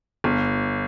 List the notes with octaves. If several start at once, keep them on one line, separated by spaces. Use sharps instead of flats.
G1